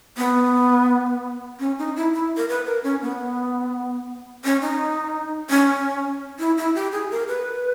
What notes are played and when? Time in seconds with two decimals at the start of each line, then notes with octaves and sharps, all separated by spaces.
0.18 B3
1.60 C#4
1.78 D#4
1.96 E4
2.13 E4
2.37 A#4
2.49 B4
2.66 A#4
2.84 C#4
3.02 B3
4.45 C#4
4.62 D#4
5.50 C#4
6.39 E4
6.58 E4
6.75 G4
6.92 G#4
7.11 A#4
7.28 B4